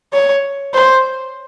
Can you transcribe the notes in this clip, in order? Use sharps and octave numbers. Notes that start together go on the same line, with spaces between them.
C#5
C5